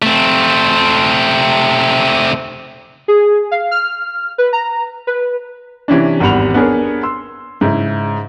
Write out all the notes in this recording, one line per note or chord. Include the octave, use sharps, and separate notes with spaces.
A3 C4
G#4
F5
F6
B4
A#5
B4
C3 E3 C#4 D4
G#1 E2 G3 F#5 B5 F7
B3 D4 G#4 A#4 C#5
C6 E6
G#2 C#3 E4